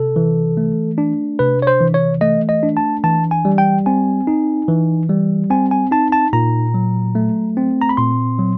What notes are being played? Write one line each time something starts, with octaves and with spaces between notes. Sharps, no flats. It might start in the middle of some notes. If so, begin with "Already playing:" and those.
Already playing: C3 A4
E3
A3
D4
C3 B4
C#5
C5
E3
C#5
A3 D#5
D#5
D4
A5
E3 A5
G#5
G3
G5
C4 G#5
D#4
E3
G3
C4 G#5
G#5
D#4 A5
A5
A#2 A#5
F#3
A3
C4
A#5
B5
A#2 C6
F#3